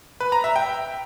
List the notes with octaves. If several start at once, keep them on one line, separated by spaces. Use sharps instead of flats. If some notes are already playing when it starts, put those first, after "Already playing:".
B4
A#5
E5
G5